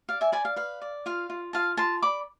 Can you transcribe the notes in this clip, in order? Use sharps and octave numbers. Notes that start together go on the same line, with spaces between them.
D5 F5
E5 G#5
D5 G#5 B5
F5
B4 F5
D5
F4 F5
F4
F4 F5 A5
F4 A5 C6
D5 B5 D6